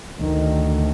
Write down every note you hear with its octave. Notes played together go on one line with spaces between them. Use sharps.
D2 D#3